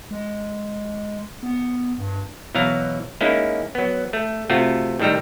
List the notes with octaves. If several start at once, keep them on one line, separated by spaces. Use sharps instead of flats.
G#3
B3
G2
B2 E3 F#3 F5 A#5
G#3 A#3 C#4 D#4 E4
F#3 B3
A3
C3 A3 F4 F#4
A2 D#3 G3 A4 A#5